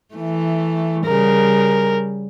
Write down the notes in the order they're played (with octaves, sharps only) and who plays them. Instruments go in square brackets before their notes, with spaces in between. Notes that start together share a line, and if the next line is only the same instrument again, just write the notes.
[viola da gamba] E3 A3
[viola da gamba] C#3 G3 [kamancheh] A#4